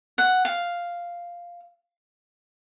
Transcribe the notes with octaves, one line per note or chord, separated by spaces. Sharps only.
F#5
F5